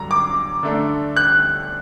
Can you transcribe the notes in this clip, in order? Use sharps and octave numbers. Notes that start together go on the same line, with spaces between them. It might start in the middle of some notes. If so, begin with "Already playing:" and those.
Already playing: G2 D3 F#3 A#5
D6
D3 A3 D4
F#6